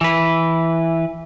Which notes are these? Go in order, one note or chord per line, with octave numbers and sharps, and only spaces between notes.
E3 B4